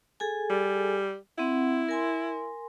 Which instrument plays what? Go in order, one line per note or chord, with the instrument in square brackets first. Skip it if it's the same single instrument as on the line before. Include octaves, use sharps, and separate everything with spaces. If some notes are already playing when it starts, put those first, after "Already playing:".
[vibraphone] G#4 A4 G#5
[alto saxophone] G3
[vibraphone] C4 F#5 [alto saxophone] E4
[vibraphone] A#4 G#5 C6